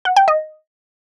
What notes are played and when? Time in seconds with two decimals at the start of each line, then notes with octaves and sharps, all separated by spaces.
0.05 F#5
0.16 G5
0.28 D#5